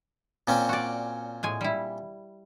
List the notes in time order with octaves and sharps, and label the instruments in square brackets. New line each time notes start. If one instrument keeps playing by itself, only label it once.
[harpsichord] A#2 C4 C#4
[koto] F#4 D5
A2 G#3 G#5
G3 E4